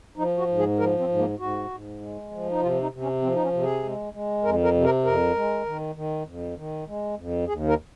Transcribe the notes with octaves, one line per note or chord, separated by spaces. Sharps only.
F3 D#4
F#4
G#2
G#4
F3 A#4
C4
G#2
A#3
G#2 F#4
G#2
G#3
F3
D#4
C3 F4
D#4
C3
C#4
F3 C4
D#4
C#4
C3
G#4
G#3
G#3
F2 A#4
A#4
C3
A#4
F2 A#4
G#3
D#3
D#3
F2
D#3
G#3
F2
D#2 G#4
A#4